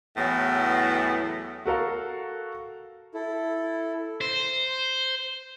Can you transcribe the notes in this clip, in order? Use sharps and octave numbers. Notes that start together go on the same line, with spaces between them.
E2 A2 F#3 B3
F#4 A4 A#4 F5
E4 A4
C5